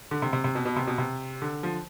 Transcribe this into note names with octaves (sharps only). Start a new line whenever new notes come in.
D3
C3
C3
C3
B2
B2
C3
B2
C3
D3
F3